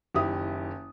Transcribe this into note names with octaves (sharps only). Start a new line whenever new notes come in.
F#1 D#3 E4 G4 D#6